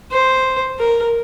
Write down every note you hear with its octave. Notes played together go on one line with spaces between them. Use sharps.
C5
A#4